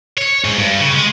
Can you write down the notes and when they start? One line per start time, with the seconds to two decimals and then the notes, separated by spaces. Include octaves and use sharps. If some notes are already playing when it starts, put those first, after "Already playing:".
0.18 C#5
0.44 G#2
0.58 G2
0.80 C#3
0.96 G#3